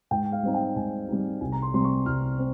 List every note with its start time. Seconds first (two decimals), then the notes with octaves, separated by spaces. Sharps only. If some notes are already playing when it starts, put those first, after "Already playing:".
0.11 G#2 G5
0.32 F5
0.43 G3 C4 D#4
0.54 G5
0.76 G#2 G#5
1.08 G3 C4 D#4
1.41 C2 G#5
1.52 A#5
1.62 C6
1.73 C3 G3 C4 C6
1.85 C#6
2.06 C2 F6
2.38 C4